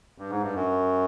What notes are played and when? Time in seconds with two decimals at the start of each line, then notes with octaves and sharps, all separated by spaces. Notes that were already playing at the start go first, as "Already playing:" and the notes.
0.18 G2
0.30 G#2
0.42 G2
0.54 F#2